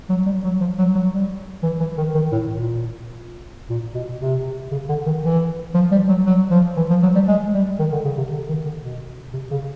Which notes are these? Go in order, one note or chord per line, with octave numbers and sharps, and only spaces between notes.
F#3
G3
F#3
F3
F#3
F#3
G3
E3
E3
D#3
D#3
A2
A#2
A#2
B2
C3
C#3
D3
D#3
E3
F3
G3
F#3
F#3
F3
E3
F3
F#3
G3
G#3
G3
D#3
D3
C#3
C3
D3
D#3
D3
B2
C3
C#3